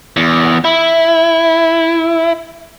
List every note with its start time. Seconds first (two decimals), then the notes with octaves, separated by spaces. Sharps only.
0.17 E2
0.64 E4